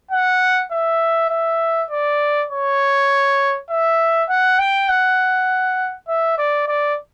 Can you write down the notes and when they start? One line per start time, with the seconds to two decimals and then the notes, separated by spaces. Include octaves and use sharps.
0.11 F#5
0.71 E5
1.30 E5
1.91 D5
2.50 C#5
3.70 E5
4.29 F#5
4.59 G5
4.89 F#5
6.08 E5
6.38 D5
6.68 D5